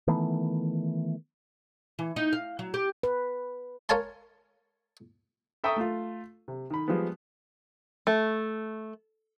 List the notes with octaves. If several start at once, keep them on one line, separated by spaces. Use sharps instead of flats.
D#3 E3 A3 B3
E3
D#4
F5
F#3
G4
B4
A#4 C#5 F5 G#5 A5 C6
A4 E5 G5 A#5 C#6 D#6
A3 F4
C3
D#3 B5
F3 G3 G#3 B3
A3